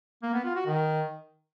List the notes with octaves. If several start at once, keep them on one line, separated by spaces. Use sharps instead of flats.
A#3
B3
F4
F#4
D#3